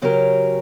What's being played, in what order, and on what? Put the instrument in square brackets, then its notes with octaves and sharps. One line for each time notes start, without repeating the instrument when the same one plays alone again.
[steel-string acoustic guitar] C#3 F#3 C#4 G4 A#4